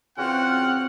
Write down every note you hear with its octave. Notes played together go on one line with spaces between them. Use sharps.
E2 C#3 C4 F4 F#4 F#5 G5 F6